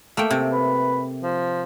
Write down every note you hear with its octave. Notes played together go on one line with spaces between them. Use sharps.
A3 A#3 G5
C3
B4
F3